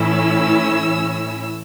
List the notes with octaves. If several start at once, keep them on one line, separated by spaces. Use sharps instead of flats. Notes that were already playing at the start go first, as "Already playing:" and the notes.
Already playing: A2 E3 C#4 E4 E6